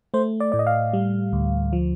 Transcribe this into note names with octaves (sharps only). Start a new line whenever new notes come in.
A3 C5
D5
A2 D5
D#5
F5
G3
D2
F3